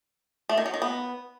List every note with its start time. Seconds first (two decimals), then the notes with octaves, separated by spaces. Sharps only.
0.49 A3
0.58 D#3
0.66 F#3
0.74 D#3
0.82 B3